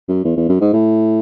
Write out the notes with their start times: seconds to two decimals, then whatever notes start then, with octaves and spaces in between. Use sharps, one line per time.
0.08 F#2
0.24 E2
0.37 E2
0.49 F#2
0.61 G#2
0.73 A2